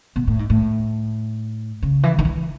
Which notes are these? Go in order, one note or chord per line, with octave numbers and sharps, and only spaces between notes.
B2
A2
G#2
A2
C#3
E3
D#3
E3